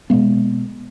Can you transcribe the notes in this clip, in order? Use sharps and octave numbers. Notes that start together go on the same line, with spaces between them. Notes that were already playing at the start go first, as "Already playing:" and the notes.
B2 G#3 B3